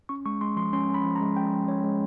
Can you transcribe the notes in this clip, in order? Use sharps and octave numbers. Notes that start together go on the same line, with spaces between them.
C#4 C#6
G#3 C#6
G#3 C6
F3 C6
C#4 C6
C#4
B5
F3
A#5
G#3
C#4 G5
F3
C#4 C#5
G#3